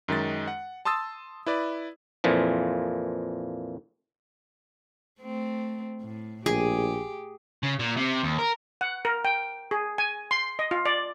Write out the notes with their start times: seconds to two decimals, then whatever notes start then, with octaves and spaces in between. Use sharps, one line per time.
0.08 F#2 D#3 G#3 A6
0.48 F#5
0.85 A5 C6 D#6 E6 A6
1.46 E4 B4 D5
2.24 F2 A#2 E3 F3
5.20 A3 C4
6.02 A2
6.46 A#1 G4 G#4
7.63 C#3
7.79 A#2
7.97 C3
8.23 D#2
8.39 A#4
8.81 F#5
9.05 A#4
9.25 G5
9.71 G#4
9.98 G#5
10.31 C6
10.59 D#5
10.71 F4
10.86 D5